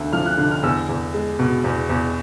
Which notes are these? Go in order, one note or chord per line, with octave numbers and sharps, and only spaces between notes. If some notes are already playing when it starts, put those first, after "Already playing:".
Already playing: D2 A3 E6
F3 F6
F#6
D3 F#6
F6
E2 E6
E2
G#3
B2
E2
E2